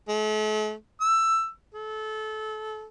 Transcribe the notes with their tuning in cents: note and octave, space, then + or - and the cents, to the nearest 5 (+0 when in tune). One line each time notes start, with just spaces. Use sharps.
A3 -45
E6 +15
A4 -25